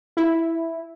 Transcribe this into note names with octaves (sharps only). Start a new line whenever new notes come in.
E4